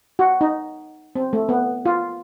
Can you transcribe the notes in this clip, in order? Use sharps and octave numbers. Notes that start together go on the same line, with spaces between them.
F#4
D#4
C4
A3
B3
F4